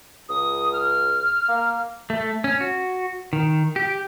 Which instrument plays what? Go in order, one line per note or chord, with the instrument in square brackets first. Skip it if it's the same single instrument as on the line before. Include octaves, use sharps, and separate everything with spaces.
[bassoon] C#2 [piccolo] D#6
[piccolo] F6
[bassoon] A#3
[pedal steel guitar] A3
C#4
F#4
D#3
G4